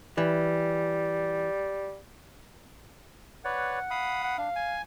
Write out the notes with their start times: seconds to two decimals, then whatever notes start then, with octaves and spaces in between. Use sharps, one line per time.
0.18 E3 G3
3.45 B4 C#5 D5 F#5
3.91 F5 B5 D#6
4.23 F#5
4.38 D4 F5
4.56 G#5